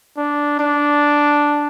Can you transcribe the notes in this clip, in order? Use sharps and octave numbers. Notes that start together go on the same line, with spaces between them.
D4
D4